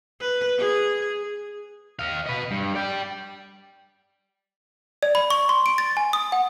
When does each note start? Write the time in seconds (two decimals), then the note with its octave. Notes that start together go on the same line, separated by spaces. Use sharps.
0.20 B4
0.58 G#4
1.99 D#5 F5
2.26 B4 D#5
2.51 G2
2.75 D5 G5
5.03 D5
5.15 B5
5.30 C#6
5.49 C6
5.66 D7
5.78 A6
5.97 G#5
6.13 D#6
6.32 F#5